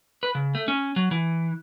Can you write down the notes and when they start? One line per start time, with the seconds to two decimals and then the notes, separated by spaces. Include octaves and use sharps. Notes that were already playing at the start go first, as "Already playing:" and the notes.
0.23 B4
0.35 C#3
0.55 A3
0.68 C#4
0.96 F#3
1.11 E3